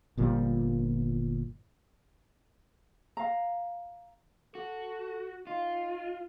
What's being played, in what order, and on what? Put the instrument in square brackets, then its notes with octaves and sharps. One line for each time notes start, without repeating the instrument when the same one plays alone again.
[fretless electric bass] G1 A#2 F3 G3
[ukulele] F5 A#5
[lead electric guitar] F#4 [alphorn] A4
[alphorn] D#4 [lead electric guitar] F4